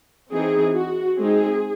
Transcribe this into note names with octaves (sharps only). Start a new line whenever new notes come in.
E3 C4 D#4 G#4
F#4
G#3 C4 D#4 G#4